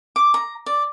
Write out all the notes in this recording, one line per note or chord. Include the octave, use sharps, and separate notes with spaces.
D6
A#5
D5